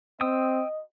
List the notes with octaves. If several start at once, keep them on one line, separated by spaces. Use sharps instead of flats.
C4 D#5 G5 D#6 E6